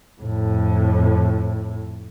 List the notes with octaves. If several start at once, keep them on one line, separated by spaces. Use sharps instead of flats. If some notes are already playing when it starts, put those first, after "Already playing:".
F2 A2